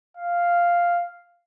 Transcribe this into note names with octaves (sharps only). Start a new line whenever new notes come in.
F5